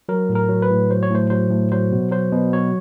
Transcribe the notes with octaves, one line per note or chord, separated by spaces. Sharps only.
F#3 A#4
A2
A#4
F#3
B4
A2
F#3 C5
C#5
A2 C5
F#3 C5
A2
F#3 C5
B2
F#3 C5
B2
F#3 C#5